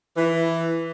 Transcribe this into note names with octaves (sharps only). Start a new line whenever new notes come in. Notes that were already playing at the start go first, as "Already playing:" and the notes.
E3